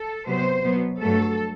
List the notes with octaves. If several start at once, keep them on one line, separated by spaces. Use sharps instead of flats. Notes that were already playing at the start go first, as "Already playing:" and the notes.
Already playing: A4
C3 F#3 B3 C5
B2 F#3 B3
G2 F#3 A3 A4